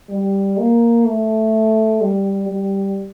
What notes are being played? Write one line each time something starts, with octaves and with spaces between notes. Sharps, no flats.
G3
A#3
A3
G3
G3